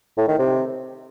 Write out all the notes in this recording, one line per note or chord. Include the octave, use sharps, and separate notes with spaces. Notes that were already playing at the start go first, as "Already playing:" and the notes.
A2
D#3
C3